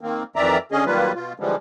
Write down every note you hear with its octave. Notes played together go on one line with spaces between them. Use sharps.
D#3 A#3 C4
F2 D#3 E3 D5 E5 A#5
D3 C#4 G#4 D#5
D#3 F#3 G3 A#3 F4 B4
B2 F4
D3 E3 F3 G3 G#3